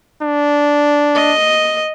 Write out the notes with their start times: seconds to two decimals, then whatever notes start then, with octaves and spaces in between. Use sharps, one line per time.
0.22 D4
1.15 D#5